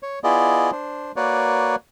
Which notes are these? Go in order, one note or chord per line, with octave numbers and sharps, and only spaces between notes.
C#5
B3 E4 F4 G#4 D5 D#5
D4 C5
A#3 F#4 A#4 B4 C#5 D5